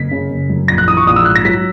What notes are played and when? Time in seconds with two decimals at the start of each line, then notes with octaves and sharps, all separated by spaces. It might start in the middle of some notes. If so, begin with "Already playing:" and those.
Already playing: F#1 B6
0.11 C#3
0.30 F#1
0.50 F#2
0.68 A#1 A#6
0.78 F#6
0.87 E3 D#6
0.97 C#6
1.07 A#1 D#6
1.16 E6
1.25 G#2 F#6
1.36 A#6
1.45 F#3 B6